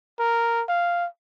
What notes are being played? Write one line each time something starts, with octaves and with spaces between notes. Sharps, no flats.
A#4
F5